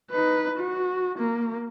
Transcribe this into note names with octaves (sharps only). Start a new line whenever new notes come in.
D#4 B4
F#4
A#3